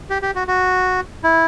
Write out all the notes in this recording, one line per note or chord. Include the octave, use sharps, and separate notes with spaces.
G4
G4
F#4
F#4
E4